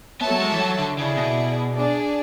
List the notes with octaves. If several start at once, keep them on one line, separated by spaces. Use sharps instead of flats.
B3 F#4 A4 C#5 E5 A5
F#3
G#3
E3
F#3
D3
C#3 E4 G#4 D5
B2
D4 G#4 D5